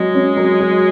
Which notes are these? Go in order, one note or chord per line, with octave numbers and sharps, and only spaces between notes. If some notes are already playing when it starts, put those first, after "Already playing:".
Already playing: F#3 G#3
C#4
F#3
F#3